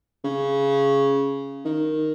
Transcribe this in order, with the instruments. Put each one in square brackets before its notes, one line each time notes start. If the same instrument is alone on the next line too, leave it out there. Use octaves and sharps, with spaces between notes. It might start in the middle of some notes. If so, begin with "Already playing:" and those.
[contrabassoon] C#3
D#3